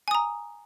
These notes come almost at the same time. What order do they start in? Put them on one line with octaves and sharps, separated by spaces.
G#5 D#6 A#5